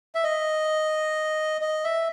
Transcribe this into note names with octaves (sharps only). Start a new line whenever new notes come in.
E5
D#5
D#5
E5